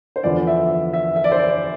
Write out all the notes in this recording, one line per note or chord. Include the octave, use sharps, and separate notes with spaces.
C5
E2 D3 F3 D5
E5
E5
E5
D5
C5
D5